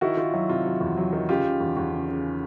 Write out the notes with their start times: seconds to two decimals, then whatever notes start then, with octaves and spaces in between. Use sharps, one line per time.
0.01 D#3 E4 F#4
0.17 D#3 F4
0.34 F#3 E4
0.49 C3 F4
0.66 F#3
0.81 E2
0.97 F#3
1.13 D#3
1.29 C#3 F4 G4
1.44 C#3
1.61 E2
1.77 E2
1.92 C#3
2.08 C#3